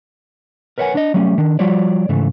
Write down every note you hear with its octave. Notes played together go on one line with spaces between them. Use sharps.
A#4 B4 C#5 E5 F#5 G#5
D4 D#5
F#3 G3 A3 C#4
D#3 D4
F3 G3 F4 F#4 C#5 D5
G#2 C#3 E3 A3